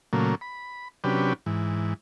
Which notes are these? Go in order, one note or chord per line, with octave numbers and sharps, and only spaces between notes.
A#2 C#3 F#3 A3 A#3
B5
C3 F#3 C#4 D4 G4 B4
G#2 E3